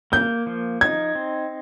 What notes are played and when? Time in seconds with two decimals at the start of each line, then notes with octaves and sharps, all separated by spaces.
0.12 A#3 G6
0.47 F3
0.81 D#4 G#6
1.15 C4